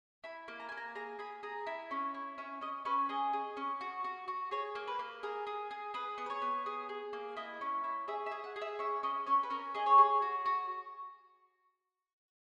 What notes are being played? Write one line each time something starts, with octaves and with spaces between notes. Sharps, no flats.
E4 B5
A#3
A#5
A#3 G#5
A#5
G#4 A#5
G#4 B5
G#4 A#5
E4
C#4
E4
C#4 E5
C#4 D#5
C#4 B4
G#4 D#5
G#4
C#4
F#4
F#4
F#4
G#4 C#5
A#3
B4
A#3
G#4 A#4
G#4
G#4
G#4 B4
B3
B4
C#5
B3
G#4
G#4
A#3
E4 D#5
C#4
E4
G#4 E5
E5
G#4
F#5
G#4
E5
C#4 E5
C#4 D#5
C#4 C#5
B4
C#4 A#4
G#4 D#5
C#5
G#4
F#4
F#4